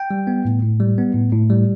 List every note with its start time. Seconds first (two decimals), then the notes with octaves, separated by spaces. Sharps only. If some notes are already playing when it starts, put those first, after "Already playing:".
Already playing: G5
0.11 G3
0.27 B3
0.45 A2
0.63 A2
0.80 G3
0.98 B3
1.15 A2
1.33 A2
1.50 G3